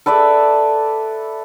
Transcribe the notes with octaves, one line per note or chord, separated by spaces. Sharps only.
A4 B4 D5 E5